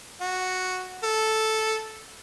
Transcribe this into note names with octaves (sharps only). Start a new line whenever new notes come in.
F#4
A4